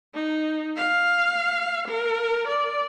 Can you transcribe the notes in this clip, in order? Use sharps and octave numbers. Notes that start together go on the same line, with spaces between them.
D#4
F5
A#4
D5